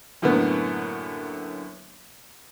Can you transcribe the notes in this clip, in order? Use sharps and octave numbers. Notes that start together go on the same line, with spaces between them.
F#2 A2 D3 A#3 B3